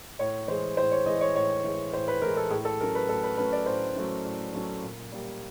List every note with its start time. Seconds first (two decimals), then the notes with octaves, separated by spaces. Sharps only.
0.19 A2 C#5
0.48 E3 G#3 C5
0.77 A2 C5
0.91 C#5
1.06 E3 G#3 D#5
1.21 C#5
1.35 A2 C#5
1.64 E3 G#3
1.93 A2 C5
2.08 B4
2.22 E3 G#3 A#4
2.37 A4
2.51 A2 G#4
2.65 A4
2.80 F#3 A3 C#4 A#4
2.95 B4
3.09 A2 A4
3.23 B4
3.37 F#3 A3 C#4 B4
3.52 D5
3.66 A2 C5
3.95 F#3 A3 C#4
4.25 A2
4.53 F#3 A3 C#4
4.82 A#2
5.12 G3 A#3